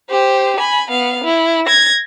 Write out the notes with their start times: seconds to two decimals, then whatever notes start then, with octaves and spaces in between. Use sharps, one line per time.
0.10 G4 C5
0.59 G#5 B5
0.91 B3 F5
1.24 E4
1.66 G#6 A#6